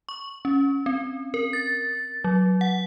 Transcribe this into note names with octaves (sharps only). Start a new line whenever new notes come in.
C#6
C#4
C4
A#4
A6
F#3
F#5